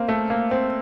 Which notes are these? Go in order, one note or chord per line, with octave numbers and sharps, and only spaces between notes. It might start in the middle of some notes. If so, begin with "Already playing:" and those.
Already playing: A#3 C4
A3
A#3
C4